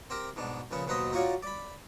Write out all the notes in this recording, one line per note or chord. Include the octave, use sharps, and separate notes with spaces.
C4 G4 A#4
G#2 B2 D4
A#1 C#3 B3 C#4
D#2 B2 F#3 B4 C5 D#5
D#4 F4 F#4 C#5 D5 F5
D5 B5